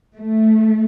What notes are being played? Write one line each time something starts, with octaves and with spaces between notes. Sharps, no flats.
A3